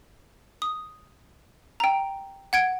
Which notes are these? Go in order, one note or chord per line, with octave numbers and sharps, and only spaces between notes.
D#6
G5 A#5
F#5 G#6 D7